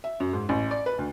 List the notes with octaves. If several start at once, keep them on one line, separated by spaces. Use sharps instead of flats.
E5
F#2
G#2
A1
D5
B4
D2